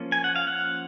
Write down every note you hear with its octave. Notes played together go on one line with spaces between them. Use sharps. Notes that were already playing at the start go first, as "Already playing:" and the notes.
Already playing: F3 A#3 C#4
G#5
F#5
F5
F#5